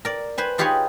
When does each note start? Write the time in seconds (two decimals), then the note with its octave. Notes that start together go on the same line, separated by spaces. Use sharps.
0.05 A#4 D5
0.38 B4 C5 G#5
0.58 D#4 F4 G4 G#4 B4 C#5